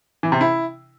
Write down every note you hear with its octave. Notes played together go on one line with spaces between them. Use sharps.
E3
C3
E4